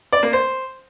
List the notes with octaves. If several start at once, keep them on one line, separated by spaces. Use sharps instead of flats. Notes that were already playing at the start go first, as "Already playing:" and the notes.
D5
A#3
C5